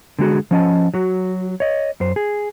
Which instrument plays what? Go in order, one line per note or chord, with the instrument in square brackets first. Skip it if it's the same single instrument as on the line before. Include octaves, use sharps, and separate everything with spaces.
[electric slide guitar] D3 G#3 F#4 G#4
F3 C#4 D#5 A5
F#3 F#4
C#5 D#5
F#2 C5
G#4